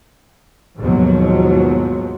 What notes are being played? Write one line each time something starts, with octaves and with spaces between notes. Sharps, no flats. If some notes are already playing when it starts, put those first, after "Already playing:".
D#2 G#2 B2 F3 F#3